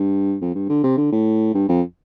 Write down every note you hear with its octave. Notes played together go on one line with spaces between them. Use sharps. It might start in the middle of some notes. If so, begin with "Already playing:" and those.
Already playing: G2
F2
G2
D3
C3
D3
A2
G2
F2